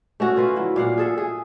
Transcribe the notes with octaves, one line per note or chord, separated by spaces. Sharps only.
A3 C#4 F#4
D3 F4 B4 F#5
F#3 E4
A#2 F5 F#5
G#4 A4 E5
G#4